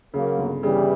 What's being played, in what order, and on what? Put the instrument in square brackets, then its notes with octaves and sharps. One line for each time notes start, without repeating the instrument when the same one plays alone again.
[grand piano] C#3 [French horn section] F#3 A#3
[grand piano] G1
[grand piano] C#3 [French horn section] E3 G3